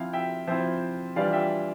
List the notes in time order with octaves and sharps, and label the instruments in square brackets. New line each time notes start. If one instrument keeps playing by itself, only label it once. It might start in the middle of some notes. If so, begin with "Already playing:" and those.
Already playing: [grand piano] F3 C4 E4 F5
E5 G5
F3 C4 E4 C5 E5
E3 G3 D4 F4 D5 F5
E5 G5